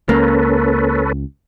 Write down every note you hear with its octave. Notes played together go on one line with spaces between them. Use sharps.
C#2 A#3 C#4 A4 B4